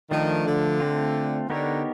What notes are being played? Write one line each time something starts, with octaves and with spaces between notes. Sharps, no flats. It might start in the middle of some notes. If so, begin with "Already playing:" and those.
D#3 F3 A3 D4
D3
A3 C4 F4
D3 B3 D#4 G4 A#4 C#5